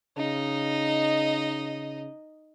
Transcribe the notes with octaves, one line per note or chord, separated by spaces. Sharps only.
C#3 D#4 D#5